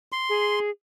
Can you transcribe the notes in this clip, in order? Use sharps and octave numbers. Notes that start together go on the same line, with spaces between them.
C6
G#4